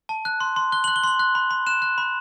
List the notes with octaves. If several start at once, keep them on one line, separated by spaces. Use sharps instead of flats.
A5
F#6
C6
C6
F#6 G7
F#7
F#6
G7
C6 F#7
F#6
B5
B5
F#6 E7
F#6
B5